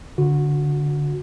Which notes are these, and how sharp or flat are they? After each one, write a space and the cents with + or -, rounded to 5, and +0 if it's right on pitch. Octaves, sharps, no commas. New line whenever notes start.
D3 -15 F#4 -20